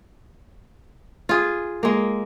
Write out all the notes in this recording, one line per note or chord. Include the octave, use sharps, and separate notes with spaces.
F4 G#4
G#3 A#3